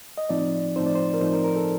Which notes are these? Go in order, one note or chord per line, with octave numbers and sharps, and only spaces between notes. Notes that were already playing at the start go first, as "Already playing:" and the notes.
D#5
A2 F3 C4 D#4 D5
A2 F3 C4 D#4 C5
D5
C5
A#4
A2 F3 C4 D#4 C5
A#4
A#4
A4